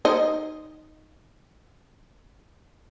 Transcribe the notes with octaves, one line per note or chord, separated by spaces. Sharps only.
D#4 C5 D#5